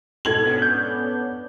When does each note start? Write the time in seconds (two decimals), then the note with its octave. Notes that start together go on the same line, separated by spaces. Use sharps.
0.25 G#2 B2 A4 G#6 F#7
0.44 B3 C#4 D4
0.62 G6